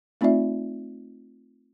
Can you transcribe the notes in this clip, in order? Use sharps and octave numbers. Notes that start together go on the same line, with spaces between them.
A3 C4 D#4 F4 D5 E5